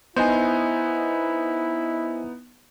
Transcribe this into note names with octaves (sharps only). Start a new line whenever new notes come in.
B3 D#4 E4 C5 D#5 G#5